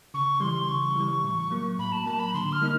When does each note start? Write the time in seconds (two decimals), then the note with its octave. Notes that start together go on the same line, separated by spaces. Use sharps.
0.14 C#3 C#6
0.40 E3 G3 C6
0.68 C#3 C#6
0.96 E3 G3
1.24 A2
1.51 F#3 A#3
1.79 A2 B5
1.92 A5
2.06 F#3 A#3 A5
2.19 B5
2.34 D3 C6
2.52 F6
2.61 G3 A#3 D#4